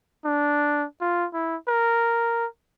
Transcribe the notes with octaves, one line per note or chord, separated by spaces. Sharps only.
D4
F4
E4
A#4